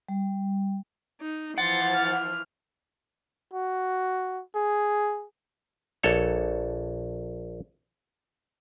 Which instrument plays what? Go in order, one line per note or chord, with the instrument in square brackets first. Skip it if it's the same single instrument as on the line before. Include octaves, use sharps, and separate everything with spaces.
[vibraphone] G3
[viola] D#4
[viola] E3 F3 [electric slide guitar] F#5 [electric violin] C6 [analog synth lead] A6
[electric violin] F6
[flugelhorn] F#4
G#4
[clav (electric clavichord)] A#1 A4 C#5